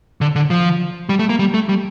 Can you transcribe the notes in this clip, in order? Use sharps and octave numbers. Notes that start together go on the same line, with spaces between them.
D3
D3
F3
G3
A3
A#3
G3
A3
G3